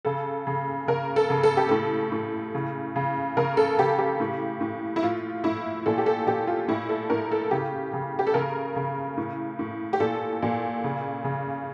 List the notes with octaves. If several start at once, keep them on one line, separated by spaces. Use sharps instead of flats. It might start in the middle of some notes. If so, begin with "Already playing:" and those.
C#3 A4
C#3
C#3 A#4
A4
C#3
A4
G4
A2 A4
A2
C#3
C#3
C#3 A#4
A4
C#3 G4
G4
A2
A2
E4
A2 F4
A2 E4
A#2 A4
G4
A4
A#2 G4
F4
A2 E4
A4
A2 A#4
A4
C#3 G4
C#3
G4
A4
C#3 A#4
C#3
A2
A2
G4
A#2 A4
A#2
C#3
C#3